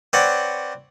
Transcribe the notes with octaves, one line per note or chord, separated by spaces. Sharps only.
C4 B4 C#5 D5 F#5